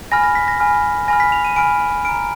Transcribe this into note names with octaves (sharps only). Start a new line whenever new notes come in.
G#5 B5 F6 A#6
A#6
B6
A#6
G#5 B5 F6
G#5 B5 F6 A#6
B6
F7
D#7
G#5 B5 F6 D7
A#5 F6 D7